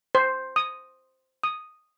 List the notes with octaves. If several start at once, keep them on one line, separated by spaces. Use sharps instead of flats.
C5
D#6
D#6